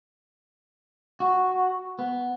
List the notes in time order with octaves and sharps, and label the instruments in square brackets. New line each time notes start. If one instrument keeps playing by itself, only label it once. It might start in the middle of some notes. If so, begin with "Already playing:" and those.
[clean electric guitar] F#4
B3